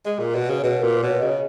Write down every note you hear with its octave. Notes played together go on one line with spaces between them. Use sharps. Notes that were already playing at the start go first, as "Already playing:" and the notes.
G#3 D#5
A#2
B2
C#3
C#5
B2 B4
A#2 A#4
B4
B2 C#5
D#5
C#3 C#5